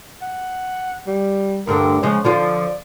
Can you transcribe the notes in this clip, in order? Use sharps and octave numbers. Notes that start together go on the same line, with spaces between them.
F#5
G3
D2 G2 D3 A#4
C#3 F3 G#3 C#5
D3 F3 F4 D5